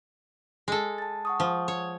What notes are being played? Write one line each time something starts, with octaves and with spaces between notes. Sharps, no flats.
G#3 A4
A5 A6
F#5 C#6 D#6
F3
C#5